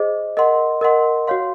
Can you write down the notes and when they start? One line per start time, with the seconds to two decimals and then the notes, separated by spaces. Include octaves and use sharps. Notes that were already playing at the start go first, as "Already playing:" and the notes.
Already playing: G#4 C5 D#5
0.37 A#4 D#5 F#5 C6
0.81 A#4 D#5 F#5 C6
1.27 F#4 C#5 F5 C6